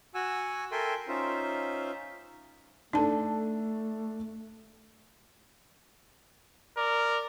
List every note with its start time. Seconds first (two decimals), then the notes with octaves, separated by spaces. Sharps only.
0.15 F#4 F#5 G#5 E6
0.72 A4 A#4 E5 G5 G#5 C6
1.08 C#4 D#4 F4 C5 E5
2.93 A3 D4 D#4 A4 A5
6.77 A#4 D5